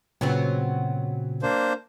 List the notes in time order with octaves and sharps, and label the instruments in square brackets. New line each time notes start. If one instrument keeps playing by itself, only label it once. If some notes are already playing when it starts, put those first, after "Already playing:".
[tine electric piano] A#2 C#3 [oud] F#3 B3 C4
[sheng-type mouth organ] A#3 D4 C5